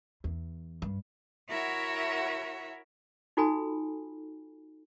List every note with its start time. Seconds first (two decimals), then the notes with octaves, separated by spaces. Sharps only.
0.24 E2
0.82 G2
1.48 E4 F#4 A#4 C#5 E5 F#5
3.37 D#4 F4 F#4 A4 G#5 B5